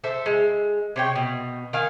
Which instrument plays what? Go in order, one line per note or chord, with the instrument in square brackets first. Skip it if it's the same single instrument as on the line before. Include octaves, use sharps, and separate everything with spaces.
[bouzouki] A4 C5 E5
G#3
C3 C#5 G5
B2
D#3 F5 G#5